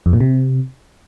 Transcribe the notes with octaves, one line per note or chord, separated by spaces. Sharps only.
F2
A#2
C3